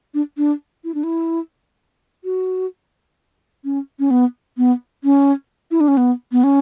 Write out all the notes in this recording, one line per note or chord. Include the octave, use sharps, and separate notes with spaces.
D4
D4
E4
D4
E4
F#4
C#4
C#4
B3
B3
C#4
E4
D4
C#4
B3
B3
C#4